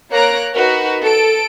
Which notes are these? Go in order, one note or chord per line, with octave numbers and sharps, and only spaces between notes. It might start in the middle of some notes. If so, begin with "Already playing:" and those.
A#3 C#5 A#5 F#6 A#6 D7
D#4 F#4 A#4 B4
A4 D7